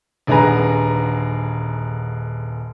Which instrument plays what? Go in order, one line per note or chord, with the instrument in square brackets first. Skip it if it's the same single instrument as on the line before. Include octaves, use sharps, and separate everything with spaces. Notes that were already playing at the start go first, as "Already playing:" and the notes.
[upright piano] D#1 D3 G#3 B4 G#5 A#5